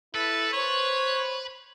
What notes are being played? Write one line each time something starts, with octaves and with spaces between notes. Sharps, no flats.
E4 A4 B4
C5 C#5